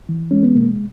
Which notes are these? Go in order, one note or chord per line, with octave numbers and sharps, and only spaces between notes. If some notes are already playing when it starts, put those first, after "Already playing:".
E3
G#3 C#4
B3
B2 A#3